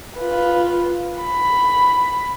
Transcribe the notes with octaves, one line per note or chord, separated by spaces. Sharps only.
F4 B4
B5